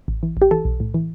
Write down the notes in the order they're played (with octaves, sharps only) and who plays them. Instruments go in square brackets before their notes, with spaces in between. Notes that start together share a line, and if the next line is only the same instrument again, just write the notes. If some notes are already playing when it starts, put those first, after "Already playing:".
[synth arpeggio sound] A1
E3
A1 G4
E3 A4
B1
A2
E3